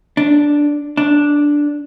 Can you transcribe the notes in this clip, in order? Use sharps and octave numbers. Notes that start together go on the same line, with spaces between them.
D4
D4